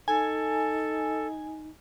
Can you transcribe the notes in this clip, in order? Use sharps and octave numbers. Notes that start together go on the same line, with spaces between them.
D#4 A4 G#5